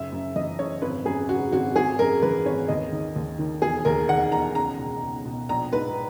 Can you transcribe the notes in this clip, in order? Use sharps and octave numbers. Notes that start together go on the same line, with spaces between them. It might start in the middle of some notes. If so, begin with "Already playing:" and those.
Already playing: F#1 E5
F#2
E3 D#5
F#1 C#5
G#1 B4
F#2 G#4
C#3 F#4
G#1 F#4
G#1 G#4
F#2 A#4
E3 B4
G#1 C#5
D#2 D#5
D#3
D#2
D#3
E1 G#4
D#2 A#4
D#3 F#5
E1 A#5
C#2 A#5
B2
C#2
B2
A#1 A#5
G#2 B4